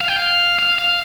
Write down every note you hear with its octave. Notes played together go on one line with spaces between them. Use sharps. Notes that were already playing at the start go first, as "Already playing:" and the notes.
F5
G5
F5
F5
F5